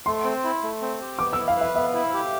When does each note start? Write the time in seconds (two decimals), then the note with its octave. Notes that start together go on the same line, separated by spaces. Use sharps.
0.06 A3 C6
0.25 C4
0.44 E4
0.63 A3
0.82 C4
1.01 G4
1.19 B3 D6
1.33 E6
1.38 E4
1.48 F5
1.57 B4 E5
1.75 B3 E5
1.94 E4
2.14 G4